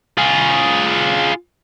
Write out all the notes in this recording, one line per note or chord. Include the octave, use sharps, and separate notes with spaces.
F4 G#4